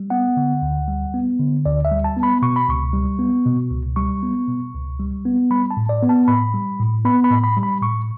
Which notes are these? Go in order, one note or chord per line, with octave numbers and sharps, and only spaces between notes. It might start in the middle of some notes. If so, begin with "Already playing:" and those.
Already playing: G3
B3 F#5
D3
D2
G3
B3
D3
D2 D5
E5
G3
A5
B3
B5
B2 C#6
B5
C#2 C#6
G3
B3
B2
C#2
G3 C#6
B3
B2
C#2
G3
B3
G3 B5
A5
A2
D5
B3
A5
A2 B5
G3
A2
B3 B5
B5
A2
B5
G3
B5
A2 C#6